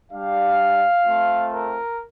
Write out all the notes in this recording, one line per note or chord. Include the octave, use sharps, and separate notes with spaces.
G3 D4 G4 F5
A3 C4 F4
A#4